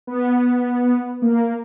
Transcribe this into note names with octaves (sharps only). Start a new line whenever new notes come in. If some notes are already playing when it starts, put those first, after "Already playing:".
B3
A#3